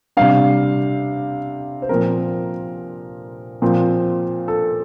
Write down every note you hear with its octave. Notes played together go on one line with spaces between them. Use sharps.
C3 G3 D4 F5
C5
A#2 F3 C4 A#4
A#2 F3 C4
A4